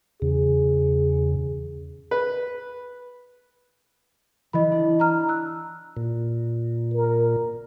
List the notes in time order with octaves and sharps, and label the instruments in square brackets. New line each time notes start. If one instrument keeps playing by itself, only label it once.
[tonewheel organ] E2 C#3 [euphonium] G#4
[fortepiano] B4
[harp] E3 [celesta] D#5 B5
[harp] D4
[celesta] E4 A#5 F6
E6 F#6
[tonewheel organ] A#2
[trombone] A#4